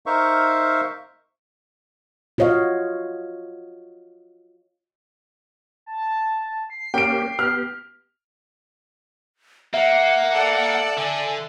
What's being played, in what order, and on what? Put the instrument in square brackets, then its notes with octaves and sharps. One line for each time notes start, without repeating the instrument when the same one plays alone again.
[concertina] D#4 A#4 C5 E5 F5 C#6
[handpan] F4 F#4 C#5 D#5 F5
[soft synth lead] A5
C7
[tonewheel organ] A#3 C#4 G4 [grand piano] G5 D7
[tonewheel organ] B3 G4 [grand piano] F6
[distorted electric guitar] A#3 [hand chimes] E5 [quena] F#5
[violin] A4 D5
[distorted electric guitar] D3 [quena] G#5